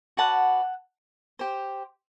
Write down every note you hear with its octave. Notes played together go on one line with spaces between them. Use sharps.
F#4 B4 D5 F#5 A5
G4 C5